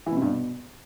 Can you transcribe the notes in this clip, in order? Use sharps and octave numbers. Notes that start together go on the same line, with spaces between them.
E3
B2
C3
G2
B2